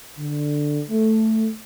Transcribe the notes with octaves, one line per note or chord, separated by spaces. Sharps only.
D3
A3